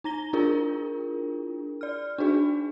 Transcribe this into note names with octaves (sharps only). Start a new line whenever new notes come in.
D#4 A#5 A#6 G7
D4 E4 F4 G#4 A#4
D5 F6
D4 D#4 F#4 G#4